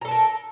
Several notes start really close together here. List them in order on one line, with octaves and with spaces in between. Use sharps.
A#5 A4 A5 A#4